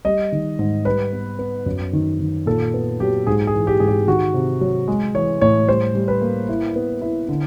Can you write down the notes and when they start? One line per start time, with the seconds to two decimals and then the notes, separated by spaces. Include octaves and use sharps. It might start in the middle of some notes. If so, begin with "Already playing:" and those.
0.05 G3 D#5
0.32 D#3
0.59 G#2
0.85 G3 B4
1.13 B3
1.39 B3
1.66 F#2
1.93 D#3
2.19 D#3
2.46 A#2 A4
2.74 B3
3.00 F#3 G4
3.27 G#2 G#4
3.47 G#4
3.54 E3
3.67 G4
3.80 G#2 G#4
3.87 G4
4.08 D#3 F#4
4.34 C3
4.61 F#3
4.88 G#3
5.15 E3 C#5
5.41 A2 C#5
5.69 G3 C5
5.95 G3
6.08 B4
6.22 A#3
6.49 E4
6.76 B3
7.02 E4
7.29 D3